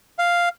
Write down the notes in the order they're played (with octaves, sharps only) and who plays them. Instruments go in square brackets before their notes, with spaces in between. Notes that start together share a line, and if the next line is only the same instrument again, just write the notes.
[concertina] F5